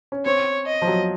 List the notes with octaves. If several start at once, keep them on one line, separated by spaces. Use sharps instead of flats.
C#4
C4 C#5
D#5
F3
F#3